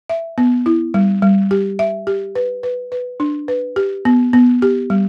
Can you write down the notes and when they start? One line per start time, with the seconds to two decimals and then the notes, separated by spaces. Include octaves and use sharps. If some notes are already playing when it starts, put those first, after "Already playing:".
0.09 E5
0.38 B3
0.66 E4
0.94 G3
1.22 G3
1.51 G4
1.79 E5
2.07 G4
2.35 B4
2.63 B4
2.92 B4
3.20 D4
3.48 B4
3.76 G4
4.05 B3
4.33 B3
4.62 G4
4.90 G3